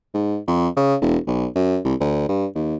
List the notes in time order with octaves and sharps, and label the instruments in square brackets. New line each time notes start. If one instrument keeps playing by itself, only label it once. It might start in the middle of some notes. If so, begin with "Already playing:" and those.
[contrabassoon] G#2
F2
C#3
E1
B1
F#2
C2
D2
G2
D#2